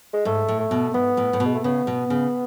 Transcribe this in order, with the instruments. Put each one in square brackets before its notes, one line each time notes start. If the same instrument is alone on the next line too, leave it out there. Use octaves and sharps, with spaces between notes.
[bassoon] G#3
[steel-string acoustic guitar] G#2 [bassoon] A3
[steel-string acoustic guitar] A2
[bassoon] A3
[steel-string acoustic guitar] B2
[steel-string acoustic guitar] G#2 [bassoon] B3
[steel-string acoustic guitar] A2
A2
B2
[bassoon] G#3
A3
[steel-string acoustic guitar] C#3 [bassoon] B3
[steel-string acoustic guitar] B2
C#3